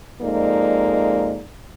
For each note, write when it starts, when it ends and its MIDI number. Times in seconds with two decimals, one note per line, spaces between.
0.22 1.42 41
0.22 1.42 56
0.22 1.42 58
0.22 1.42 63
0.22 1.42 74